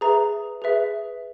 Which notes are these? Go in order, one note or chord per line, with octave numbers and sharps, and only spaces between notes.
G#4 B4 E5 A#5
G#4 B4 E5